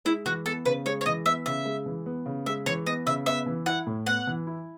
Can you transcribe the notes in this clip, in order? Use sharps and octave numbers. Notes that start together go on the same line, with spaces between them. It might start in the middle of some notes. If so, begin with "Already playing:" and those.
G#3 E4
E3 F#4
B3 A4
C#3 B4
G#3 C#5
C#5
E3 D#5
B3 E5
C#3 E5
G#3
E3
B3
C#3
G#3 E5
E3 C#5
B3 D#5
C#3 E5
B3 E5
E3
E4 F#5
A2
B3 F#5
E3
E4